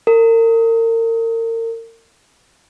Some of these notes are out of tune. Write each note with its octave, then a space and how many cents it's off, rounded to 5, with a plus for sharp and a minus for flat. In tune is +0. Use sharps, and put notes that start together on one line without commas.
A#4 -35